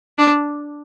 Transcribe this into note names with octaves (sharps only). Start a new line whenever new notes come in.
D4